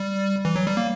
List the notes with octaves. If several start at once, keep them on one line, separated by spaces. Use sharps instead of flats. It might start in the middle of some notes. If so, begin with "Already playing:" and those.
Already playing: G3
E3
F#3
G3
A#3